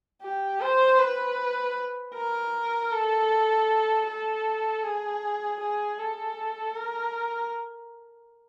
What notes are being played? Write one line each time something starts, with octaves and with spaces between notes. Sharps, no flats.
G4
C5
B4
A#4
A4
A4
G#4
G#4
A4
A#4